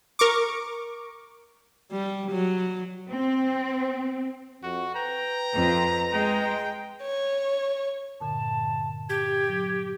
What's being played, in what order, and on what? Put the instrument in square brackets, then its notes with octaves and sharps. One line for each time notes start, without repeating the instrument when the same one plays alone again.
[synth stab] A#4 C#6 D6
[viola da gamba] G3
F#3
[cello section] C4
[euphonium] F2 [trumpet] F#4
[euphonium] B4 [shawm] G5 [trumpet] A#5
[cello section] F2
[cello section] G#3 [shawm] G5
[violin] C#5
[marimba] G2 A#2 D3 [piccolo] A5
[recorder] G4 [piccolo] G#6
[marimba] F#3